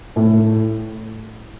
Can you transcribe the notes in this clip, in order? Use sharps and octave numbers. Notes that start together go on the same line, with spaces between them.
A2